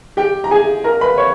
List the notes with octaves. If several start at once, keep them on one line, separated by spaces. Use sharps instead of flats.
G4 G5
A#5
G#4 G#5
A#4 A#5
B4 B5
C#5 C#6